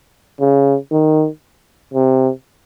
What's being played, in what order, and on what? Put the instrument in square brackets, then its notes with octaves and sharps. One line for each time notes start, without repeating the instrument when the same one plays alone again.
[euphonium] C#3
D#3
C3